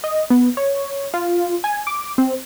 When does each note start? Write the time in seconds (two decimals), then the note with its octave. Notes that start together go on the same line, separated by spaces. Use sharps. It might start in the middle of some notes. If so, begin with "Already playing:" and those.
0.04 D#5
0.30 B3
0.57 C#5
1.14 F4
1.64 G#5
1.87 D6
2.18 C4